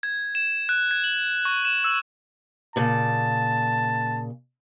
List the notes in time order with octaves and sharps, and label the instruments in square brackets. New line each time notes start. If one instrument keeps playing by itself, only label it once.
[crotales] G#6
E7
F#6
G#6
F#7
C#6
E7
E6
[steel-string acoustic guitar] A#2 C#3 [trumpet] A5